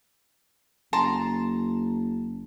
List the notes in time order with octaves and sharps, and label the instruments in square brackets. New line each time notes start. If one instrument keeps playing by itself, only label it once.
[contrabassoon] F#1 [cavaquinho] A5 A#5 C6